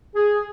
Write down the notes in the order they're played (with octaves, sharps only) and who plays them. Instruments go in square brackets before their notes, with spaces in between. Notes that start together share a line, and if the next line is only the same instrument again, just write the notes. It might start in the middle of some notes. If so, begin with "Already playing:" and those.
[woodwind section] G#4